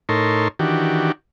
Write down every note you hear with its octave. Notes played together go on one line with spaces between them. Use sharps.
A2 D#4 A4 A#4 C#5 C6
D#3 E3 D4 F#4 G4